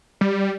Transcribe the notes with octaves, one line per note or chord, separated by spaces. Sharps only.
G3